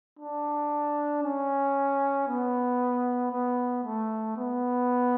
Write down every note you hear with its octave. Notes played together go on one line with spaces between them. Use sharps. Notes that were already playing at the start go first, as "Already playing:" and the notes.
D4
C#4
B3
B3
A3
B3